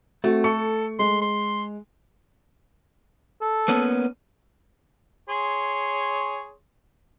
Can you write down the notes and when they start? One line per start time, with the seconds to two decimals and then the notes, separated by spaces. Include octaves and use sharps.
0.24 A3 C4 F#4
0.44 A4 C#6 C#7
0.99 G#3 C6
1.21 C6
3.41 A4
3.68 A#3 B3 C#4
5.29 G#4 C#5 C6